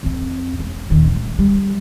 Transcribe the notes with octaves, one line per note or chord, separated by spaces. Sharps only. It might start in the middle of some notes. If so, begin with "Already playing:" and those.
F2 C4
E1
D#1 D#3
A3
G3